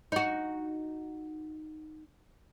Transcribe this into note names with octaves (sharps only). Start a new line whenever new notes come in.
D#4 F#4